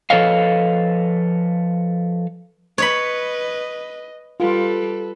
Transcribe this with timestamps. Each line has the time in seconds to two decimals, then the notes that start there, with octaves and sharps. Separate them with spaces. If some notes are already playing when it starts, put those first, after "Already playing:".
0.10 F3 A4 B4 C#5 D#5 F5
2.78 B4 C#5 D#5 B5
4.40 G3 F4 A4 B4